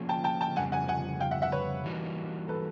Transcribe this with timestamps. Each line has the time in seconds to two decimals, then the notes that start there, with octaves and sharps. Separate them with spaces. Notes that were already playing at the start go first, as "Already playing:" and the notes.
Already playing: F3 A#3 C#4 F4 G#4
0.09 G5 A5
0.24 G5 A5
0.41 G5 A5
0.56 F2 C#3 G3 F#5 G#5
0.72 F#5 G#5
0.88 F#5 G#5
1.20 F5 G5
1.31 E5 F#5
1.42 E5 F#5
1.52 B4 C#5
1.84 E3 G3 A#3 D#4 F#4
2.48 A4 B4